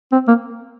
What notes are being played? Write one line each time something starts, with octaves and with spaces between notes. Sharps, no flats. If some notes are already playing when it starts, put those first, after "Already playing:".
C4
A#3